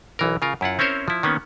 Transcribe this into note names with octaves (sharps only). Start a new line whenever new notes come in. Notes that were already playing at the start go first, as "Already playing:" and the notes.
B1 E3 A#4
C#3 F4 A#4
F#2 E4 F4 F#5
C4 C#4 E4 A#4 C5 C#5
F3 E4
D#3 A#3 B3 C#4